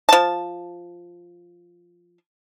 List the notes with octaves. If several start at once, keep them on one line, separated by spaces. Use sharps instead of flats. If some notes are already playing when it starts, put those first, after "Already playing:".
F3 A5